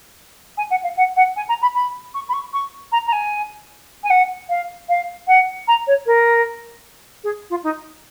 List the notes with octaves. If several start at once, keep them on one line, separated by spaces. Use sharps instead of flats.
G#5
F#5
F5
F#5
F#5
G#5
A#5
B5
B5
C#6
B5
C#6
C#6
A#5
A#5
G#5
G#5
F#5
F5
F5
F#5
A#5
C#5
A#4
G#4
F4
D#4